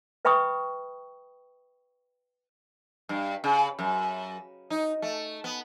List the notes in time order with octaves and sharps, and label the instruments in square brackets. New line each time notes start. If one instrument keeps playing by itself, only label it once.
[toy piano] B4 E5 G5 B5 C#6 D#6
[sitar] G2
C#3
F#2
D#4
A3
B3